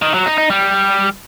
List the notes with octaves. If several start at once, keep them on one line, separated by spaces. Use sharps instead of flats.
D#3
F#3
D#4
D#4
G3